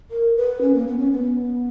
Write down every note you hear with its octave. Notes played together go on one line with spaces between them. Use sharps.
A#4
B4
C#4
A#3
B3
C#4
B3